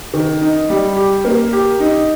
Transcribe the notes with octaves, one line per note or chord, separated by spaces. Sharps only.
D#3
D#4
G3
G4
A#3
G4
D#4